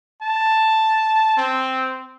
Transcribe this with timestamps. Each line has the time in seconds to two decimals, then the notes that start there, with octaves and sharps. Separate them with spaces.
0.22 A5
1.37 C4